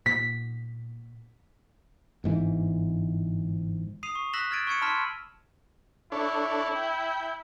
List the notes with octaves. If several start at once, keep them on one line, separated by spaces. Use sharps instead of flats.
A#2 B6
G1 G#2 E3
D#6 C7 D#7 F7
C#6
E6 F#6 A#6 B6 E7 F#7
F6 G#6 A6 D7 D#7
C#6 E6 G#6 C#7 D#7
A5 B5 C6 F6 B6 E7
D4 E4 A4 C#5
G5